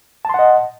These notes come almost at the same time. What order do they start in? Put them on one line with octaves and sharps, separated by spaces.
A5 C6 F#5 D#5